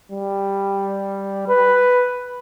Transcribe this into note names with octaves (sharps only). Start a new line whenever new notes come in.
G3
B4